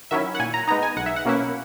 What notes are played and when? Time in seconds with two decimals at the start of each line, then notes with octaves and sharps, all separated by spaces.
0.11 D#3 F#3 C#4 E4 E5
0.35 F#5
0.39 A#2 G#5
0.54 A#5
0.67 G#3 B3 D#4 A#5
0.83 G#5
0.96 B1 F#5
1.06 E5
1.16 F#5
1.25 B2 A#3 C#4 E4